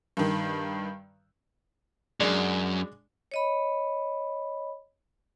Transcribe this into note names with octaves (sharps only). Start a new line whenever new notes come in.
G2 D#3
F#2 G#3 D4
C#5 D#5 B5